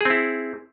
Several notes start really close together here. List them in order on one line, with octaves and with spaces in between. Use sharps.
G#4 C4 E4